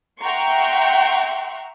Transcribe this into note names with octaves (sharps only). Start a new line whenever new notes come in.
E5 F#5 G5 A#5 C6 C#6